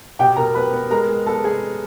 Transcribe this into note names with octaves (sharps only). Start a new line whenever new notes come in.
B2 G4 G5
B2 A#4 A#5
B3 B4 B5
B3
G#3 A#4 A#5
G#3
B3 A4 A5
G#3 G#4 G#5